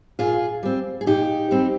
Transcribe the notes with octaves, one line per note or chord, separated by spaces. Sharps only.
A#2 F4 G#4
G3 C4
G#4
A#2 D#4 G4
G3 C4